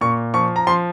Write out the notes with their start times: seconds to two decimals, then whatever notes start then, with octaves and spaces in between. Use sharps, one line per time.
0.01 A#2 C#6
0.34 F3 C#6
0.56 A#5
0.67 F3 C6